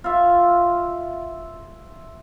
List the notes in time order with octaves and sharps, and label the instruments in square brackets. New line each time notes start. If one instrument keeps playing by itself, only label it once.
[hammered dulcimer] F4 E5